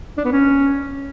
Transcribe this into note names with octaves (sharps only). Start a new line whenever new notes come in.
D4
B3
C#4